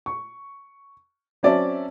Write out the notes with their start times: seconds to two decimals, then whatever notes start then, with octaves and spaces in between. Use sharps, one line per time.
0.06 C#6
1.43 F#3 C4 C#4 D5 E5 A5